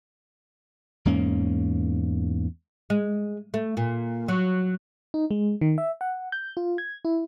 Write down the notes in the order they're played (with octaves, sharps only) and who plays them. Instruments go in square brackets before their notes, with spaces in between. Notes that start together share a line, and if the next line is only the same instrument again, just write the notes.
[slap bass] E2 G#2 A#3 C#4
[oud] G#3
A3
A#2
F#3
[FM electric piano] D#4
G#3
D#3
E5
F#5
G6
F4
G#6
E4